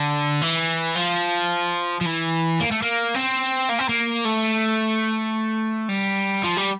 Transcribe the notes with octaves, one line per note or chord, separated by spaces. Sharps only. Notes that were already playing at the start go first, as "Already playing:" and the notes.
Already playing: D3
E3
F3
F3
E3
A#3
A3
A#3
C4
A#3
C4
A#3
A3
G3
F3
G3